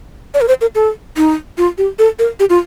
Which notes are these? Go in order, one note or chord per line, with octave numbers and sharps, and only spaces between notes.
D5
A#4
C5
A#4
A4
D#4
F4
G4
A4
A#4
G4
F4